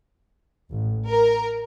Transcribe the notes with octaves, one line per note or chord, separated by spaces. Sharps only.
A1
A#4